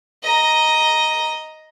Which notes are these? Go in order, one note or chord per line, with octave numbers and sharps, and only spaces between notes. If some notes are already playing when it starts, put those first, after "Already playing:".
D#5 A#5